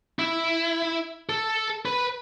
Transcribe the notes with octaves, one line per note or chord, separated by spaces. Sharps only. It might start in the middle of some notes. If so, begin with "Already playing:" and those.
E4
A4
B4